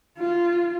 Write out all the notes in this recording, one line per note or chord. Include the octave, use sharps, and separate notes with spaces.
F4